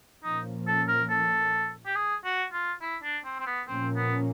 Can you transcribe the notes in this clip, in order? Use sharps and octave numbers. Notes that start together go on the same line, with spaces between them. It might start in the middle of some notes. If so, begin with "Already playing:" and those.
A#2 F3 A#3 C#4 D#4
A4
A#4
A4
G4
G#4
F#4
F4
E4
D4
C4
C4
B3
A#2 F3 A#3 C4 C#4
B3